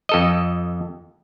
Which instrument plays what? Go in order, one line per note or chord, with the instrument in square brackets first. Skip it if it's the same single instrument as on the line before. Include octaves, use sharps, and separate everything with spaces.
[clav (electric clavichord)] F2 A4 D#5